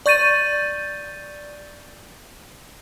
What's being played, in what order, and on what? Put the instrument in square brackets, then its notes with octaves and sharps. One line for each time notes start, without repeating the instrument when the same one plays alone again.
[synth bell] D5 C#6 G6 A6 D#7